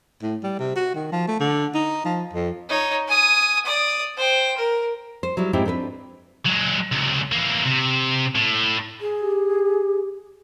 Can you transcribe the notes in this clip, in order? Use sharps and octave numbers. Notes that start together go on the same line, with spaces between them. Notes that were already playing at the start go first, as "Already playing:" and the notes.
A2
G3
C3
F#4
D#3
F3
A3
D3
D#4
F3
F2
D#4 C#5
G#5 D#6
D5 D#6
C5 G5
A#4
C5
F#3 G3 E4
G#2 C4 D#4 E4 G4
C4 D4 A#4 B4
F#3 G#3
C#2 C3
E3 A#3
C3
A2
G#4
G4